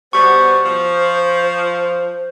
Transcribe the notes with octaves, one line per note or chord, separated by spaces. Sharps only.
B2 G3 B3 C5 C#6
F3